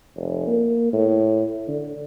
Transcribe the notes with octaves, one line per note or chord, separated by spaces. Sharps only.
F1
A#3
A2
D3